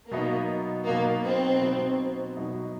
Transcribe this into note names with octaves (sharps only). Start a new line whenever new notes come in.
B2 F#3 A#3 B3 D#4
B2 F#3 A#3 B3 D#4
C4
B2 F#3 B3 D#4
B2 F#3 B3 D#4